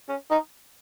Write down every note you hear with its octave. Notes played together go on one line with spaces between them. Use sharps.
C#4
D#4